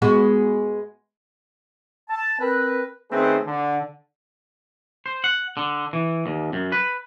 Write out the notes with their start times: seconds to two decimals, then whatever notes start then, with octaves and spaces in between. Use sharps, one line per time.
0.02 G#3 B3 F#4
2.10 A5
2.40 C4 A#4 B4
3.11 D#3 A3 C4 C#4 G#4 B4
3.46 D3
5.06 C5
5.24 F#5
5.57 D3
5.93 E3
6.26 D#2
6.53 F#2
6.72 B4